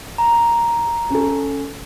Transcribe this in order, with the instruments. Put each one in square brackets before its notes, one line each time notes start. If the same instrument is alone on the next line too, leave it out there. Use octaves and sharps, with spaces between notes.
[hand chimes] A#5
[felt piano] C#4 A4